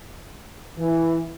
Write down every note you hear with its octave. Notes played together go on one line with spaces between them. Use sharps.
E3